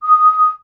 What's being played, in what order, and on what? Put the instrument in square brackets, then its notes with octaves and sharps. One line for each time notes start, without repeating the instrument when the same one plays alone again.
[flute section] D#6